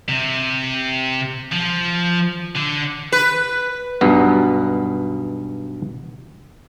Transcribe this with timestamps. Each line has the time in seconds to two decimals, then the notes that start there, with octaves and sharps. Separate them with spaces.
0.09 C3
1.52 F3
2.55 D3
3.12 B4
4.01 B1 G2 B2 B3